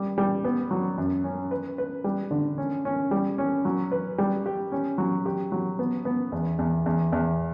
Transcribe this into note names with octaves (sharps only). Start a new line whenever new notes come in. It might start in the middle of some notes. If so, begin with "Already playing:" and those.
Already playing: G3
G3
B3
F#3
F#2
C#4
B4
B4
G3
D3
C#4
C#4
G3
C#4
F#3
B4
G3
G4
C#4
F#3
G4
F#3
B3
B3
E2
E2
E2
E2